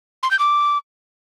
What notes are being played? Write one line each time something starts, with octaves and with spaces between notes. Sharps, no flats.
C6
G6
D6